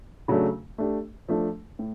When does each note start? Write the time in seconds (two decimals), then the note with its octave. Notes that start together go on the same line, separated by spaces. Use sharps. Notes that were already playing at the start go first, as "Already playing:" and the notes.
0.28 C#3 F#3 A3 D4
0.78 A3 D4 G4
1.29 F3 A3 D4
1.79 A2